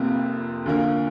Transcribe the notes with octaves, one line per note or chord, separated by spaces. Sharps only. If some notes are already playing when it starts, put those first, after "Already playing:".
Already playing: F1 F2 C3 A#3
D2 D3 A#3 F4 A#4